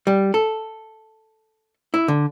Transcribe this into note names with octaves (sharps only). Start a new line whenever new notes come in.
G3
A4
E4
D3